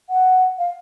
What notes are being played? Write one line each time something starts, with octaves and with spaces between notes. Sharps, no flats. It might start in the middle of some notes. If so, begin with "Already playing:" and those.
F#5
F5